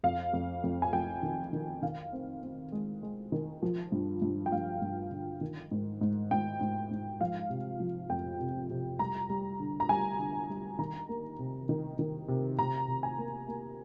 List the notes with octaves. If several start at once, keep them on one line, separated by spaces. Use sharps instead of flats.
F2 F5
F2
F2
G#5
F2 G5
D#3
D#3
D#3 F5
C4
C4
G#3
G#3
D#3
F3
G2
G2
G5
G2 F5
G2
D3
D#3
G#2
G#2
G#2 G5
G#2
G#2
F3 F5
C3
F3
F2 G5
C3
C3
G3 A#5
G3
D3
A#5
G3 G#5
D3
G3
D#3 A#5
A#3
C3
D#3
D#3
C3
C3 A#5
C3
G#5
A#3
A#3